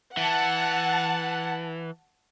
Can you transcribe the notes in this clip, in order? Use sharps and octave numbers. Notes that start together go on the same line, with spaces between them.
E3 F#5 A5